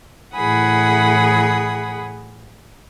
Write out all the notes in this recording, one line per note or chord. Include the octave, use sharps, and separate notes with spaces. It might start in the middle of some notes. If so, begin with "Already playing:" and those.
A2 E3 G#4 F#5 B5 D#6